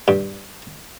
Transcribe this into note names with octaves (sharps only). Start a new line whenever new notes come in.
G2